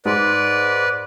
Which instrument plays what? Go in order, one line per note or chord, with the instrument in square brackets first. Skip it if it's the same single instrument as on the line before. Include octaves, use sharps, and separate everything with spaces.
[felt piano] G#2 [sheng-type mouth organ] B4 D5